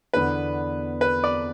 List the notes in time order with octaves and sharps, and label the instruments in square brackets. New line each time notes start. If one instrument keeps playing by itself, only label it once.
[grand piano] E2 D3 B3 D4 [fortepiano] B4
[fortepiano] B4
D5